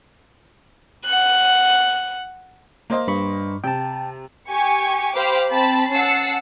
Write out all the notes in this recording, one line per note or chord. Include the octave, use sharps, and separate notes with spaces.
F#5 F#6
A#3 C5 D#5
G2 B5 C#6
C3 G5 A5
G4 G#5 C#6
G4 C5 F5 B5 D6 F6
C4 A5 B5
C#4 F#5 A5 E6 C7 C#7